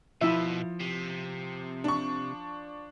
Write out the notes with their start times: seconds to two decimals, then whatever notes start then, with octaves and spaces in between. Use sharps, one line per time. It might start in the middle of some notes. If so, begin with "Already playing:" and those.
0.21 B1 B2 F3 E4 E5
0.80 C3
1.84 D4 C#6